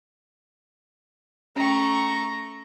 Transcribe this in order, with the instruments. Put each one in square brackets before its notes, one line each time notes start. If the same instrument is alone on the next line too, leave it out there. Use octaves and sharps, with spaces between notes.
[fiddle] A3 C#6 [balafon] C#4 G5 [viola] A#5